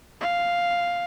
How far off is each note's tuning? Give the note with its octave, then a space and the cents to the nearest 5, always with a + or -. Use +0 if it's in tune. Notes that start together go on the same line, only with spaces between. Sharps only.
F5 +0